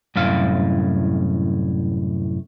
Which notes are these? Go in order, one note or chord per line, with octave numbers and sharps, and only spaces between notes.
C2 F#2 A2 F5